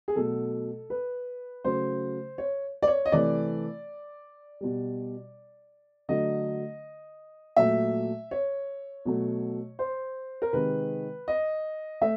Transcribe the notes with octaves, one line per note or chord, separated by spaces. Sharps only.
G#4
B2 F#3 A3 A4
B4
C#3 F#3 A3 C5
C#5
D5
C#5
D#5
C3 E3 A3 D5
B2 G3
D3 F#3 A3 D#5
A#2 F#3 A3 E5
C#5
B2 F#3 A3
C5
A#4
C3 D#3 G#3 B4
D#5
A3 E5